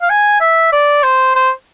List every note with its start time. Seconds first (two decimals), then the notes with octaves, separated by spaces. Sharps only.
0.01 F5
0.09 G#5
0.40 E5
0.73 D5
1.03 C5
1.35 C5